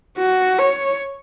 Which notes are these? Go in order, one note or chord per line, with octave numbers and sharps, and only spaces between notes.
F#4
C#5